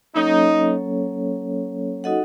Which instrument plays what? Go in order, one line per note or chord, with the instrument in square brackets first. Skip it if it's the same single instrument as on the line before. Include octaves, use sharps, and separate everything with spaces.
[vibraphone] F#3 A#3 C#4 A4 C#5 [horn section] D#4
[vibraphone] D#4 F#4 A4 D#5 F#5